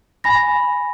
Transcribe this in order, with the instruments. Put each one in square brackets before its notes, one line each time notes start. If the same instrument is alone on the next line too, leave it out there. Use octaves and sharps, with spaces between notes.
[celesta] G#5 B5 A#6